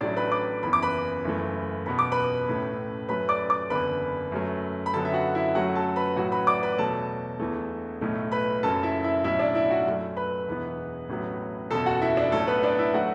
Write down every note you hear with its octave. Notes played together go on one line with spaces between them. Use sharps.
A1 A2 F#3 A3 D4 D5
B4 B5
D5 D6
F#1 E2 E3 B5
D6
B4 B5
F#1 F#2 E3 A3
E2 B2 B3 B5
D6
B4 B5
A1 A2 A3
F#2 F#3 A3 B4 B5
D5 D6
D5 D6
F#1 E2 D3 B4 B5
F#2 F#3 A3
B5
F#2 D3 F#3 B3 A4 A5
E5
F#4 F#5
E4 E5
F#2 F#3 A3 F#4 F#5
A4 A5
B4 B5
A1 A2 F#3 F#4 F#5
B4 B5
D5 D6
B4 B5
E2 B2 F#3 A3 A4 A5
E1 E2 E3 A3
B1 A2 A3
B4 B5
F#1 F#2 F#3 A4 A5
E4 E5
E4 E5
B1 A2 F#3 E4 E5
D4 D5
E4 E5
F#4 F#5
F#2 F#3 A3
B4 B5
E1 E2 E3 B3
A1 A2 F#3 B3
F#1 E2 B2 A4 A5
F#4 F#5
E4 E5
D4 D5
B1 A2 F#3 A3 A4
B3 B4
D4 D5
E4 E5
F#3 A3 F#4 F#5